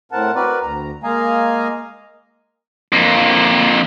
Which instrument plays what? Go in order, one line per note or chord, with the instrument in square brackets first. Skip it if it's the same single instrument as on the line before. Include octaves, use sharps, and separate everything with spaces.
[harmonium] A2 C4 A#4 F#5 A5
C4 F#4 A#4 B4 D5
D2 A#5
G#3 A#3 D#5 F5 G#5 A#5
[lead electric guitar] F2 A#3